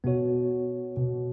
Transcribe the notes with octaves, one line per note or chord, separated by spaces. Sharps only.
B2 B3 F#4 C#5
B2